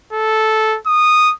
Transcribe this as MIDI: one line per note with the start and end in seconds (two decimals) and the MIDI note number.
0.13 0.78 69
0.87 1.33 87